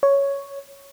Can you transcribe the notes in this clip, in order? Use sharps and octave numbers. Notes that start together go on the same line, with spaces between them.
C#5